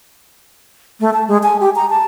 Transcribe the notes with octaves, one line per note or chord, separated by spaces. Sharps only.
A3
A5
G#3
G#5
G4
A#5
A5